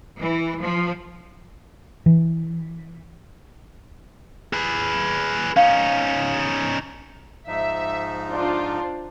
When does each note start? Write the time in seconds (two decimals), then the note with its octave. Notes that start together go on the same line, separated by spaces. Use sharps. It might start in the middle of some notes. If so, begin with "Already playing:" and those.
0.19 E3
0.61 F3
2.06 E3
4.53 G#4 B4
5.57 C#4 D#4 F5
7.48 G#2 F3 D#4 E5
8.30 D4 F4 C5